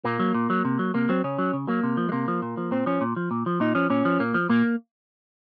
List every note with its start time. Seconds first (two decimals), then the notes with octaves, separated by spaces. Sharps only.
0.05 A#2 A#3
0.19 F#3
0.35 A#2
0.50 F#3
0.65 C3
0.79 F#3
0.94 C3 A#3
1.09 F#3 C4
1.24 C#3 C#4
1.39 F#3
1.53 C#3
1.67 F#3 A#3
1.83 C3
1.97 F3
2.09 G#3
2.12 C3 A#3
2.28 F3
2.42 A#2
2.57 F3
2.71 A#2 C4
2.86 F3 C#4
3.01 A#2
3.16 F3
3.31 A#2
3.46 F3
3.60 A#2 D#4
3.75 F3 C#4
3.90 A#2 C#4
4.05 F3
4.19 A#2 A#3
4.34 F3
4.49 A#2 A#3